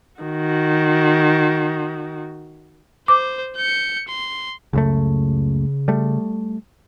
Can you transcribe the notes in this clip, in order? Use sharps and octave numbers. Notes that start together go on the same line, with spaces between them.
D#3 F#4
C5 D6
G6 C#7
C6
C#2 F#2 C#3 A3
G3 A3